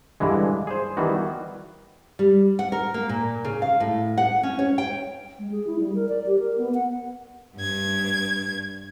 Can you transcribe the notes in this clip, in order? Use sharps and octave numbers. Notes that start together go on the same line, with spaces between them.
G2 D3 E3 G#3
G#4 C5
D#3 E3 G3 B3 F#4
G3
F#5
A#4
A#3
A#2
C#3
F5
A2
F#5
C#4
C#5
G5
G#3
G#4
E4
G3
A#4
D5
G4
A#4
B3
F#5
G2 G#6